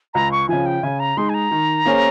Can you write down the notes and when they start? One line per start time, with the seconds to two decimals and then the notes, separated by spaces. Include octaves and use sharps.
0.14 C#2 A#5
0.32 C#6
0.49 C#3 F3 G#5
0.66 G5
0.83 C#3 G#5
1.00 A#5
1.17 G#3 D#4 C6
1.29 G#5
1.34 A#5
1.51 D#3
1.85 A#3 C#4 G#4 C5